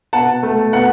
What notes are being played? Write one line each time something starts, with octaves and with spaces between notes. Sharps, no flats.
B2 F#5 A5
A3
B2 F#5